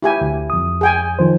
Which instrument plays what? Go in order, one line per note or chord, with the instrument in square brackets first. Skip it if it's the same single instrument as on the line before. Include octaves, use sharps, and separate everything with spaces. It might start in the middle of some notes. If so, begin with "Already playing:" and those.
[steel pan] E4 G4 G#5
[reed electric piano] D2
F2 D#6
[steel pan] G#4 G5 G#5
[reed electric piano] D#3 F3 C5